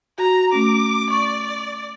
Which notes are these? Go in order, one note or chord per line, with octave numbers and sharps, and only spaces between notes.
F#4 A#5
A3 C#4 D6
D5 C#6